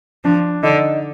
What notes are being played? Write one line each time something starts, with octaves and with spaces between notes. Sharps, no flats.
F3 D4
D3 D#4